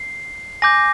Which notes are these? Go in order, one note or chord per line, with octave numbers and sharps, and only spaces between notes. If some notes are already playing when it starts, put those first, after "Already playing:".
Already playing: C7
G#5 D6 G6 A#6